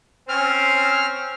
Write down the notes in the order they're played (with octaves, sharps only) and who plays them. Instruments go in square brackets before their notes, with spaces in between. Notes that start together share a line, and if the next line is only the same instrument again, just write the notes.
[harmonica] C4 C#4 [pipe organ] F6